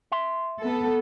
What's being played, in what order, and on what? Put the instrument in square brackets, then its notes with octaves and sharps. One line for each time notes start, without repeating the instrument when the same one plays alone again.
[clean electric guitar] E5 C6
[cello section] B3 A4